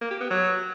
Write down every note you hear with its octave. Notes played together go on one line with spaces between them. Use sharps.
A#3
G4
B3
F#3